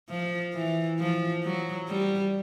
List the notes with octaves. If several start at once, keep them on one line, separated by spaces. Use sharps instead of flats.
F3
E3
F3
F#3
G3